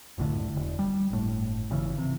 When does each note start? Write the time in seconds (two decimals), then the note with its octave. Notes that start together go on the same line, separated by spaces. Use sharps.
0.18 F#1 C#2 A2 D3
0.56 E1
0.79 G3
1.10 G1 A2
1.71 G#1 C#3 E3
1.98 C3